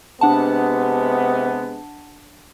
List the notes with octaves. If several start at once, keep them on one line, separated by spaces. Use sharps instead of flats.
C3 G#3 B3 D4 F#5 A5